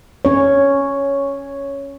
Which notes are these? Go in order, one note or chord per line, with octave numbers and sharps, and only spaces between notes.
C#4 C#5